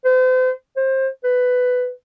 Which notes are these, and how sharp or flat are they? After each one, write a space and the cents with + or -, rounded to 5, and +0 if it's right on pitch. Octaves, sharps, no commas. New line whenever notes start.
C5 -40
C5 +25
B4 +10